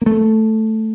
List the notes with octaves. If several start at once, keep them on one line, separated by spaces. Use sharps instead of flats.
A#3
A3